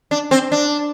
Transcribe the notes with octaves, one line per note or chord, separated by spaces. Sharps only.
D4
C4
D4